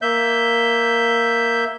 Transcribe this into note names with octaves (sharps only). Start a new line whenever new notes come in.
A#3 E5 G6